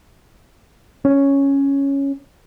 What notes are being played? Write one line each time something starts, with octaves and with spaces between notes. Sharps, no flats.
C#4